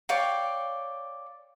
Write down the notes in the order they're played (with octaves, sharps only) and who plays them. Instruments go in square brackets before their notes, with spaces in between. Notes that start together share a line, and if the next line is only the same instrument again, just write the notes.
[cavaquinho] C#5 D5 F5 G5